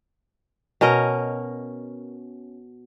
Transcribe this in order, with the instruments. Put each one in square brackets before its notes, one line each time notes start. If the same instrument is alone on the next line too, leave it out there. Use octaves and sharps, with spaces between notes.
[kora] B2 C#4 A#4 D#5